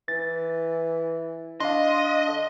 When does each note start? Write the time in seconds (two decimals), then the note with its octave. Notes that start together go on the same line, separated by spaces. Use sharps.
0.08 E3 A6
1.60 D4 D#5 F5 C6
2.28 D3